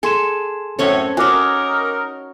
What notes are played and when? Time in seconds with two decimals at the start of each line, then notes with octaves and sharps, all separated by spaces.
0.03 G#4 A4 G#5 C6 E7
0.79 F#2 A2 C4 C#4 A4 C#5
1.17 C#4 D#4 F#4 A#4 G#5 D6